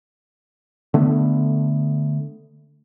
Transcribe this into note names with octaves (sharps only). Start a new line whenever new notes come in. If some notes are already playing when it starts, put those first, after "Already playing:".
D3 A3 B3